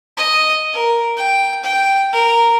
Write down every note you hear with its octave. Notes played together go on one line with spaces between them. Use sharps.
D#5
A#4
G5
G5
A#4